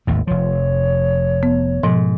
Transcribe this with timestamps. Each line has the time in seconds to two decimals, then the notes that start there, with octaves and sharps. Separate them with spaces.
0.07 G#1 D#2 A2
0.27 F1 F3 C#5
1.43 B3
1.83 G#2 B2 F3